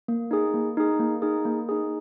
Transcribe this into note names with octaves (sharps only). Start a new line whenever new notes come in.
A#3
D#4 G#4
A#3
D#4 G#4
A#3
D#4 G#4
A#3
D#4 G#4